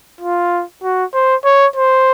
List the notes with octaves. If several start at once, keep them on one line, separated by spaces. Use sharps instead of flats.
F4
F#4
C5
C#5
C5